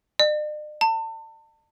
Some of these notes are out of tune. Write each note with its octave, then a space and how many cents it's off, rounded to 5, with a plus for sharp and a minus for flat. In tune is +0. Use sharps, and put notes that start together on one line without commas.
D5 +45
A5 +35